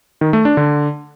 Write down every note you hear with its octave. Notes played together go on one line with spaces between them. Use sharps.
D#3
A3
D4
D3